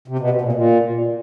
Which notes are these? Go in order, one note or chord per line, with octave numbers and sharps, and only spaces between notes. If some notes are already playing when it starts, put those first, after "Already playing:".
C3
B2
C3
A#2
A#2